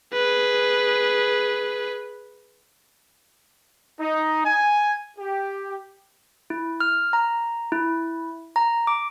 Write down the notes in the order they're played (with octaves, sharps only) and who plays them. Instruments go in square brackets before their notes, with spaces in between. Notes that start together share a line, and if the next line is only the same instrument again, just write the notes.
[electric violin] G#4 B4
[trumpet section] D#4
G#5
G4
[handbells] E4
F6
A#5
E4
A#5
D6